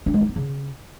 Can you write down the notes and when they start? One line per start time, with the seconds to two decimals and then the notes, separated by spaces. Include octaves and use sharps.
0.06 D4
0.14 G#3
0.21 D#4
0.29 B3
0.36 C#3